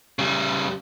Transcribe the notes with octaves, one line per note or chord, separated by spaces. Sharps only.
C#3 G3